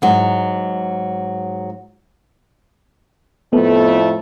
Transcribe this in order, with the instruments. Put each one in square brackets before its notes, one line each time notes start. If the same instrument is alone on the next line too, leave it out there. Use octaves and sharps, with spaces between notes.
[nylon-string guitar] G#2 F#3
[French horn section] F2 A2 A3 [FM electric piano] B3